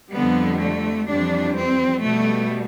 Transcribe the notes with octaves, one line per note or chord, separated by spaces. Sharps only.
F2 D3 G3 B3
A3
F2 E3 G3 D4
C4
B2 G3 A3